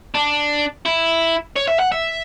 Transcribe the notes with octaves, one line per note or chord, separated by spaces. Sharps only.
D4
E4
C#5
E5
F#5
E5